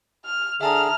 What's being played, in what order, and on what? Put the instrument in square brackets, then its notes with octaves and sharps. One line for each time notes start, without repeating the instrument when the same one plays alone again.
[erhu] F6
[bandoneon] D3 G#4 [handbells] E5 A5 A#5 [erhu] F6